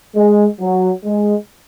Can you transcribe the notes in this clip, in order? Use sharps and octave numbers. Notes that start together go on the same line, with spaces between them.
G#3
F#3
G#3